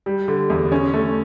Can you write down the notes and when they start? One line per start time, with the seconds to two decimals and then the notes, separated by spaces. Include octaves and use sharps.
0.06 G3
0.28 D3
0.50 E2
0.72 C#4
0.94 A3